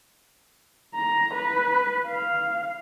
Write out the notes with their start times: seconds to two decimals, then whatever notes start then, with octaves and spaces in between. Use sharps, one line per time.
0.95 A#5
1.33 B4
2.07 F5